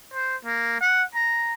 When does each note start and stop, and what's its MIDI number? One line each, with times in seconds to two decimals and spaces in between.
0.14 0.36 72
0.45 0.77 58
0.81 1.03 78
1.15 1.54 82